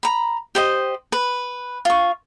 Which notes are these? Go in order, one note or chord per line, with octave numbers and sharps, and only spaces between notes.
A#5 B5
G4 C5 D#5
B4
F4 C#6